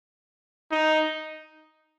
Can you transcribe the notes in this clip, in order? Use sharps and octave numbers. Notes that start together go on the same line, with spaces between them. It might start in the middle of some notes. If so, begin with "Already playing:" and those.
D#4